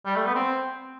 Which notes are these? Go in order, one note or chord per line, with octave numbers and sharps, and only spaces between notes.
G3
A3
B3
C4